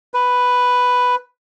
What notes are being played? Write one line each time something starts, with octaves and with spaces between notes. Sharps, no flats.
B4